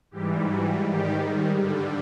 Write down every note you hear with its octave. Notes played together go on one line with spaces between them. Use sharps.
G#2 E3 G3 G4
F#4
G#2 D#3 G3 G4
G2 D3 G3